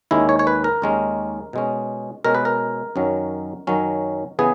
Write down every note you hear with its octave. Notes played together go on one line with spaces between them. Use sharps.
D#2 D#3 G#3 C#4 E4
C#5
C#5
B4
A#4
D#2 D#3 G#3 C#4
B2 G#3 C#4
B2 G#3 C#4 A#4
B4
A#4
F#2 D#3 F#3 C#4
F#2 D#3 F#3 C#4
C#3 E3 B3 G#4